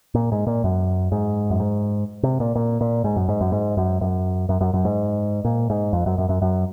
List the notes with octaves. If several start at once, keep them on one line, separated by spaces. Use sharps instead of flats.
A#2
G#2
A#2
F#2
G#2
F#2
G#2
C3
A#2
A#2
A#2
G#2
F#2
G#2
F#2
G#2
F#2
F#2
F#2
F#2
F#2
G#2
A#2
G#2
F2
F#2
F#2
F#2
F#2